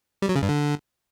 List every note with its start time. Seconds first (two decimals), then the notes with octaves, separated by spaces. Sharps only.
0.22 G3
0.29 F#3
0.36 C#3
0.42 G2
0.49 D3